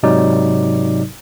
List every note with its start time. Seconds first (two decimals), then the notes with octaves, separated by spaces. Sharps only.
0.03 G#2 C3 F#3 D#4 D5